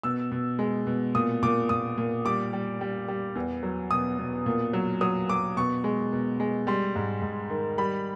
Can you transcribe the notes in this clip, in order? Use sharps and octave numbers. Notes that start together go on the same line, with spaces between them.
B2 E6
B2
G#3
B2
A#2 D#6
A#2 D6
A#2 D#6
A#2
G3 D6
G3
G3
G3
E2
F#3
B2 D#6
B2
A#2
F#3
F#3 D#6
F#3 D6
B2 C#6
G#3
B2
G#3
G3 C6
G#2
G#2
D#3
G3 B5